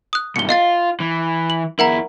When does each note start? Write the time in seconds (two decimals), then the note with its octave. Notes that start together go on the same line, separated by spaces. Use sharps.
0.13 D#6 F#6
0.36 B1 G2 C#7 G7
0.49 F4 D#5 F5 A6
1.00 E3
1.50 F#7
1.79 F2 E4 A#4 F#5 A#5